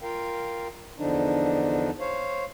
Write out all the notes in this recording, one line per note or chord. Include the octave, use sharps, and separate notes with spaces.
F4 A#4 F5 G5
E2 D3 F3 D4 D#4
C5 C#5 F5